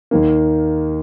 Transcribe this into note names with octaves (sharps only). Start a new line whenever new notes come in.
D#2 D#3 A#3